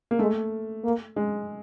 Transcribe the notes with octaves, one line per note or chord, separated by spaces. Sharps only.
A#3
G#3 A3
A#3
G#3